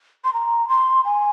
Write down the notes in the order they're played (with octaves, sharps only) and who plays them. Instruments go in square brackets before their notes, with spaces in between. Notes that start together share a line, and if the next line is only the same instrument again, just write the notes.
[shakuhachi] C6
A#5
C6
G#5